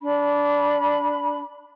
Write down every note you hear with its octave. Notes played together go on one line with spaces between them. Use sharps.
D4 B5